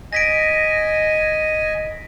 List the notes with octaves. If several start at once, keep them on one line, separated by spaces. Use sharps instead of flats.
D#5 G#5 A#6 B6 D7